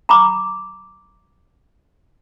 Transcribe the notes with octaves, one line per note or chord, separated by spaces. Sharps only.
A#5 B5 D6